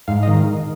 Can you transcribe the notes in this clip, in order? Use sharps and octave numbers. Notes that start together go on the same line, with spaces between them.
G#2 F5
D#5
D#3